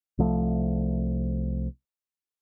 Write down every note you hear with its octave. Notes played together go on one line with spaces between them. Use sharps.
C2 F3 A3